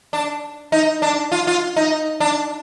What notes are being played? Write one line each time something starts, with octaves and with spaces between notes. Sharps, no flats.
D4
D#4
D4
F4
F4
D#4
D4